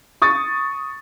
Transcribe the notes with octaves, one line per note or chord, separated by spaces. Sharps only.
C#6 D#6 A6